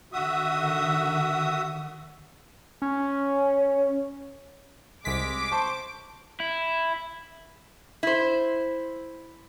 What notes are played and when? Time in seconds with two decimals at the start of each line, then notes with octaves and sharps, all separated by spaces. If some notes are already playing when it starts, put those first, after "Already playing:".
0.13 D3 D#3 F#4 E5 D#6
2.82 C#4
5.05 C2 G#3 D6 B6
5.52 C5 A5 C#6
6.40 E4
8.03 E4 C5